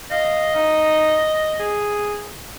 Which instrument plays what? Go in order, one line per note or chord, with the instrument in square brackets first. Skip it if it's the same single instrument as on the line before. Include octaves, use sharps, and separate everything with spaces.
[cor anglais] D#5 [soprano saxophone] F5
[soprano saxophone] D#4
G#4